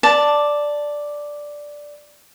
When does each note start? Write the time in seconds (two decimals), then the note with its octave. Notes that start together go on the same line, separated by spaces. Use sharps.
0.03 D5 A5